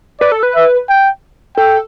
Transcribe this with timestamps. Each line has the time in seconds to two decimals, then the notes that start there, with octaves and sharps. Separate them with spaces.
0.20 B4 D5
0.32 A4
0.43 B4
0.55 E5
0.89 G5
1.57 A4 G5